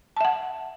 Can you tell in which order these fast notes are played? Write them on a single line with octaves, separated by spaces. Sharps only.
A5 E5 F#5